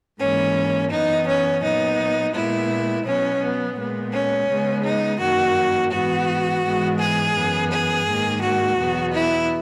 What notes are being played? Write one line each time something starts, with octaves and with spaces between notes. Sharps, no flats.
G#2 E3 A#3 C#4
F#2 E3 B3 D#4
C#4
A#2 F#3 B3 D#4
A#2 G#3 B3 E4
B2 F#3 B3 C#4
B3
A#2 G#3 B3
C#4
C#3 G#3 B3
D#4
F#2 D#3 A#3 F#4
G#2 E3 B3 F#4
G#2 E3 G#3 B3
G#4
F#2 E3 B3
G#4
G#2 D#3 A#3
F#4
E2 B2 F#3 B3
E4